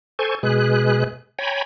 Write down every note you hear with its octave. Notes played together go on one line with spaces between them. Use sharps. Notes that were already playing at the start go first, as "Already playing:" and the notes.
A4 C5 G#5 C#6
B2 G#3 G#4 B4 F#6
C#5 G5 G#5 A#5 B5